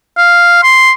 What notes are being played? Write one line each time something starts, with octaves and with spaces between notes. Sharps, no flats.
F5
C6